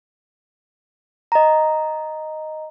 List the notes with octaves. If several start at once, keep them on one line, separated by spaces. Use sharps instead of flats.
D#5 A#5